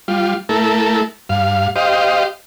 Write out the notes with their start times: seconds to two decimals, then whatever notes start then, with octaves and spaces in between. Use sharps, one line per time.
0.08 G3 F4
0.49 A3 E4 A4 A#4
1.29 G2 F5
1.76 G4 C5 D#5 F5